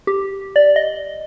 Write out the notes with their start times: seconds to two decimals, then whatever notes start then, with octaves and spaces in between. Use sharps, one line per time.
0.07 G4
0.56 D5
0.76 D#5